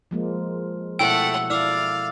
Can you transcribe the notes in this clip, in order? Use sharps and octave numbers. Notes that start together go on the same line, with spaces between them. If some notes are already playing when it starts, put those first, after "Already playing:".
F3 G#3 A#3
B2 A3 E4 A4 F#5 G5 E6
E4 D5 F5 D6 E6 F6